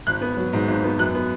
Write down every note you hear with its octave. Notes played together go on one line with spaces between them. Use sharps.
G#1 F#6
B3
F#3
G#2
G#1
B3
F#2 F#6
B3